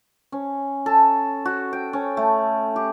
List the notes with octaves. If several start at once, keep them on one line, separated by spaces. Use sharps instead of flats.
C#4
A4
F#4
G5
C#4
A3
G4